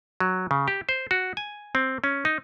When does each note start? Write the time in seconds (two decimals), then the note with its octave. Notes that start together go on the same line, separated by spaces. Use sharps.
0.20 F#3
0.51 C#3
0.68 G4
0.89 C5
1.11 F#4
1.37 G#5
1.75 C4
2.04 C#4
2.25 D#4